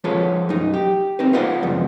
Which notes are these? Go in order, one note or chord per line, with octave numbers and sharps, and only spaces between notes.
F3 F4 G#4 A4 B4 C#5
F#2 D#4
G4
C4 D#4 B4
F4 G#4 B4 C5 D5 F#5
C#2 F#2 B2 F3